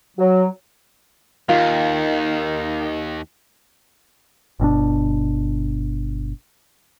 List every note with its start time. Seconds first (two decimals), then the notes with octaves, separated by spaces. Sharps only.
0.17 F#3
1.49 D#2 D#3 F4
4.60 G1 B2 C4 D4